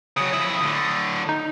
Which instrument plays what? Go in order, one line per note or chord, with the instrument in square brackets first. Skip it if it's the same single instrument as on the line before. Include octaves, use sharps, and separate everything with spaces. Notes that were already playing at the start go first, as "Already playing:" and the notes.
[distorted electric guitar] C#3 F#3 [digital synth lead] D#6
[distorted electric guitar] F2 E4
A2 D3
[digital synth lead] D#4